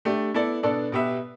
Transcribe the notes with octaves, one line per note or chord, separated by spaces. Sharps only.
A3 D4 G4
B3 E4 A4 D5
B2 B3 D4 A4 D5
B2 B3 G4 B4 E5